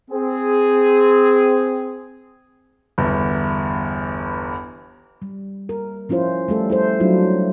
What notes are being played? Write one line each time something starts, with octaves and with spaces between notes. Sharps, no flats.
C4 G#4
G1 E2
G3
A#4
F3 C#4 E4 F4 C5
G3 A3 A4
E4 A4 C5
F#3 G3 D4 E4 F4